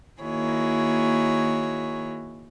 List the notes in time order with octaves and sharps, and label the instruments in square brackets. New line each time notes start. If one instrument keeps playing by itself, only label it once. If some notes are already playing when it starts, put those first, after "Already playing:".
[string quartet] D#3 A#3 E4 F#4 G#4 C#5